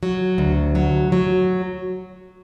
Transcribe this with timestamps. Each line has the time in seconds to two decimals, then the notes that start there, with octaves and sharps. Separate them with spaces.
0.03 F#3
0.38 D2
0.75 F#3
1.12 F#3